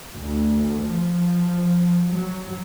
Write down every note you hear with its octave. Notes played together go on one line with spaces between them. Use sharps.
D2
F3
F#3